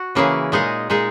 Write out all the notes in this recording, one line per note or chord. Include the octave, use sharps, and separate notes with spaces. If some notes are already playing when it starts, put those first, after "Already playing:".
Already playing: F#4
C#3 E3 A#3 C#4 G#4
A#2 G#3 D#4 G#4
A#2 G#3 D#4 G#4